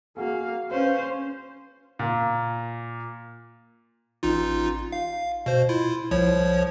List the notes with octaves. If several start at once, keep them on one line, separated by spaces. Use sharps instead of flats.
A#3 F#4 G#4 F5
C#4 B4 C5 F5
A#2
A1 D#4 F4
F5
B2 C5
E4 F4
C2 F3 C#5